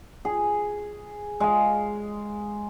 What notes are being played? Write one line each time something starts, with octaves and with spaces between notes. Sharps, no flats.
G#4
G#3 F5